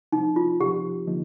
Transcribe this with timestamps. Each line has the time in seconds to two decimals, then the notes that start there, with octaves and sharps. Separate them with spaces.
0.12 C3 F3 C4 D#4
0.36 F4
0.60 C3 F3 C4 G4
1.07 D3 F3 A#3 D#4